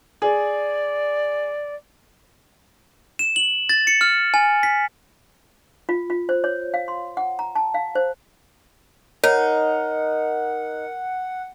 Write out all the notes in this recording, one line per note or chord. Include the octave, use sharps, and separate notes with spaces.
G#4 D5
E7
F#7
A6
C#7
F6
G#5
B6
F4
F4
C5
C#5
F5
C6
F#5
A#5
A5
F5
C5
D#4 A#4 C#5 F#5